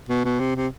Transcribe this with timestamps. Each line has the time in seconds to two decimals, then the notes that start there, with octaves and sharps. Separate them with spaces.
0.09 B2
0.25 B2
0.39 C3
0.56 C3